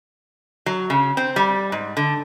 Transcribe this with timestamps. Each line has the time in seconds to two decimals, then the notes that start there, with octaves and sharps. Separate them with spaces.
0.66 F#3
0.90 C#3
1.17 C4
1.36 G3
1.72 G#2
1.97 D3